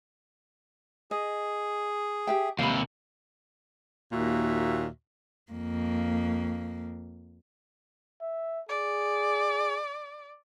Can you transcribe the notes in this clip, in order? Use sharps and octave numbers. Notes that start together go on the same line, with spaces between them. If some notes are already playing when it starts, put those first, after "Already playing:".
G#4 D#5
G4 E5 G5
D#2 C3 F5 B5
D#2 A#2 F#4 E5
F2 A#3
E5
G#4 D5